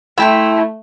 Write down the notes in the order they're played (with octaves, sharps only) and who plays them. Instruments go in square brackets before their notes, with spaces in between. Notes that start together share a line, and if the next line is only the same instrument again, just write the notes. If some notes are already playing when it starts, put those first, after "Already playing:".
[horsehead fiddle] A3 [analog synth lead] E4 [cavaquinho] E5 G5 C6